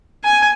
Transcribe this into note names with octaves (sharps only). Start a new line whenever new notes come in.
G#5